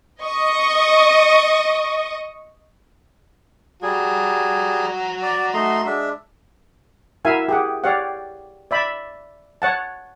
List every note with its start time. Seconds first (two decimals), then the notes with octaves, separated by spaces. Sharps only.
0.23 D#5 C#6 D#6
3.83 G3 F#4 G#4 A#5
5.23 D5
5.54 A3 D#4 C6
5.86 G#3 D4 E5
7.25 E4 F#4 A#4 E5 F5 G#5
7.49 G4 G#4 F#5
7.84 G4 C#5 D5 F5 F#5
8.71 D5 E5 B5
9.62 C#5 F#5 A5